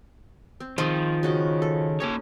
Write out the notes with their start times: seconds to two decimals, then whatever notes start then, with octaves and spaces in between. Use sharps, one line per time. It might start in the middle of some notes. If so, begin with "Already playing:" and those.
0.60 C4
0.78 D#3 F3 C4 G#4
1.23 C#3 F#4 D#5
1.62 A4
2.00 A#3 C#4 D#4 C#5